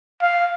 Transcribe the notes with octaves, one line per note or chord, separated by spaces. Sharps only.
F5